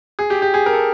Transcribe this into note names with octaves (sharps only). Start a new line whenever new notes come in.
G#4
G4
G4
G#4
A#4
A4